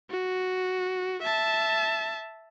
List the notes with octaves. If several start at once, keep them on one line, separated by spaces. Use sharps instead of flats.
F#4
E5 A5